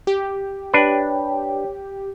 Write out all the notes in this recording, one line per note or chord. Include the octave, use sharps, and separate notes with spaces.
G4
D4 B4 C#5 G5